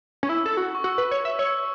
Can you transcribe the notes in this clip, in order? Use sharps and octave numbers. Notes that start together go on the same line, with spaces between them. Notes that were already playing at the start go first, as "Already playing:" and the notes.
C#4
E4 E6
A4
F#4
C#6
F#4 E6
B4
C#5
E5
C#5 E6